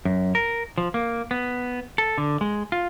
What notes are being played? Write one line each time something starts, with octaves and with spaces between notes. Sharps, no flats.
F#2
A#4
F3
A#3
B3
A4
D3
G#3
F4